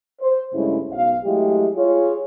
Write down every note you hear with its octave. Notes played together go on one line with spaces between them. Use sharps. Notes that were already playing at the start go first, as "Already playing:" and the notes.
C5
G2 C#3 G#3 A3 C#4 E4
B1 F5
F#3 G#3 A3 E4 G4
F4 G#4 C#5